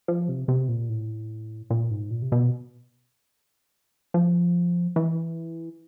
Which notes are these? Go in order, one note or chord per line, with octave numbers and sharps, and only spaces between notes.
F3
C3
C3
A#2
A2
A#2
G#2
A#2
C3
B2
F3
E3